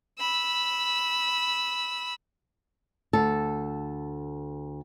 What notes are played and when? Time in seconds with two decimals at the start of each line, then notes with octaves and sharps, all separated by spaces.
0.19 B5 E6
3.13 D2 A4